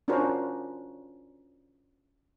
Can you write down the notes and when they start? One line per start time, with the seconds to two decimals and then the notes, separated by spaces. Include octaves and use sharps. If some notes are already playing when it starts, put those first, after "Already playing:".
0.08 C#4 D4 F4 F#4 A#4 C5